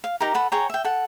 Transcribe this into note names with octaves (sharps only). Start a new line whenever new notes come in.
F5
D#4 G4 A#4
A4 F#5 B5
G#4 C#5 G5 A#5
E5 G5
A4 F#5